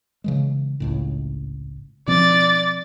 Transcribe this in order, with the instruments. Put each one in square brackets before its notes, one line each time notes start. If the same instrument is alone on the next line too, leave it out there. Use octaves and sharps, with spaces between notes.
[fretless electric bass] C#3 E3 G#3
G#1 C#2 A2
[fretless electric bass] B2 F3 C4 [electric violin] D5 A6